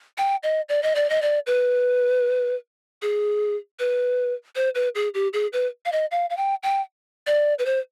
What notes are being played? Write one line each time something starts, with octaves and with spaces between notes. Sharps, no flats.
G5
D#5
D5
D#5
D5
D#5
D5
B4
G#4
B4
C5
B4
G#4
G4
G#4
B4
F5
D#5
F5
F5
G5
G5
D5
B4
C5